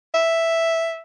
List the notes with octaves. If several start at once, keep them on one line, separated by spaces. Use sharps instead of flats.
E5